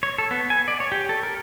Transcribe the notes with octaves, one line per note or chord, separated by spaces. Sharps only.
C#5
A4
B3
G#5
D5
C#5
G4
A4
A#4